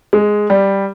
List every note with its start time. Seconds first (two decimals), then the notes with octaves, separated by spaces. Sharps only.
0.13 G#3
0.50 G3